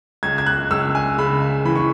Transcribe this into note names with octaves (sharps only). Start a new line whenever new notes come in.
C#2 G#6
G#6
F#6
C#2 E6
G#5
C#3 B5
E3 B5
C#6